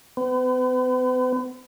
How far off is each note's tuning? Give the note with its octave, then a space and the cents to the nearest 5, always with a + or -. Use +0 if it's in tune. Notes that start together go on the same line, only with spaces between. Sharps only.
B3 +45